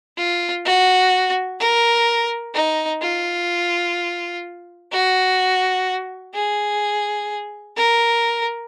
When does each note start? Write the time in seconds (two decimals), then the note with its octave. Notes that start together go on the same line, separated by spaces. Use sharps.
0.17 F4
0.65 F#4
1.60 A#4
2.55 D#4
3.02 F4
4.92 F#4
6.34 G#4
7.77 A#4